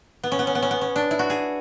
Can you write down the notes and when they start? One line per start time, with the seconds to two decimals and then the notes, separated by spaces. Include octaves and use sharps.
0.24 B3
0.32 C#4
0.39 B3
0.47 C#4
0.55 B3
0.62 C#4
0.71 B3
0.81 C#4
0.96 D4
1.11 E4
1.19 F#4
1.30 G#4